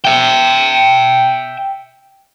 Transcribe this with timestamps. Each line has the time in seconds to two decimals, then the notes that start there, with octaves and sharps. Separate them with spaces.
0.05 E5 G5